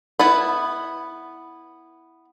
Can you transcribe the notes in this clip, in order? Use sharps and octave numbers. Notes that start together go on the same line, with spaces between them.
B3 E4 B4